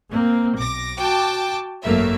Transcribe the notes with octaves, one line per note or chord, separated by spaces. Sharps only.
A#3 C4
B1 D6 A#6
F#4 G5 A5 D6
G#1 F#2 A3 A#3 E5